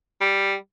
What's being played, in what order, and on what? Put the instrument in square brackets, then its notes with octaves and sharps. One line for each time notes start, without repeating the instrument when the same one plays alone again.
[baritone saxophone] G3